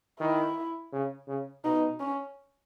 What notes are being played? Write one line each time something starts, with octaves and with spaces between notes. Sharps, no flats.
D#3 E4
C#3
C#3
B2 D#4
C#4